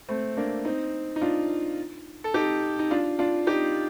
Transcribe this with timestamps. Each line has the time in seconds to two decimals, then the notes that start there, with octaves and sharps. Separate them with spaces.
0.09 A3 C4
0.37 A#3 D4
0.65 C4 D#4
1.16 D#4
1.21 D4 F4
2.24 A4
2.34 D#4 G4
2.79 D#4
2.91 D4 F4
3.19 D4 F4
3.47 D#4 G4